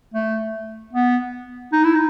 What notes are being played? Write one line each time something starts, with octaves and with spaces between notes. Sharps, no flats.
A3
B3
D#4
E4
D#4